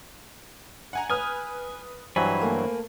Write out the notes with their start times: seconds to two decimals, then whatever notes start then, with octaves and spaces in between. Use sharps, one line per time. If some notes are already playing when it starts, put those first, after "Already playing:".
0.93 F#5 G#5 A#5
1.10 B4 G#5 D#6 F6
2.16 G2 E3 F#3 C5 G#5 B5
2.41 A3 A#3 A#4